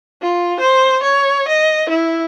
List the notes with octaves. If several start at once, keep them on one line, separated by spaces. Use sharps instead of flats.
F4
C5
C#5
D#5
E4